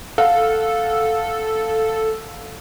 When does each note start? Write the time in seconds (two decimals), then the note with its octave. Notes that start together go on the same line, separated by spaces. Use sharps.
0.18 A4 F5 F#5